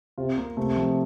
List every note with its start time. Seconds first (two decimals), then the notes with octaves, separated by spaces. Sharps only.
0.18 C3 F4
0.38 A#3
0.57 C3 A3
0.77 F3